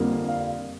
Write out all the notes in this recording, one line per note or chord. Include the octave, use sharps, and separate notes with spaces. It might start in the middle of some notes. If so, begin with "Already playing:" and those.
Already playing: F2 D3 G3 A#3
F5